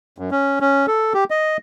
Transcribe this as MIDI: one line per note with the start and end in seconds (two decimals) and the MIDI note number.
0.18 0.30 42
0.31 0.60 61
0.60 0.86 61
0.88 1.13 69
1.14 1.24 67
1.30 1.57 75